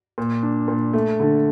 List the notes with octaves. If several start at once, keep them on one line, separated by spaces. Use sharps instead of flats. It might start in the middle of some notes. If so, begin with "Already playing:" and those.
A#2
D4
A#2
A3
D3